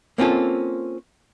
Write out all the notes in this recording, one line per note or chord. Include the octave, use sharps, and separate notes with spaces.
A#3 C4 C#4 F4 A4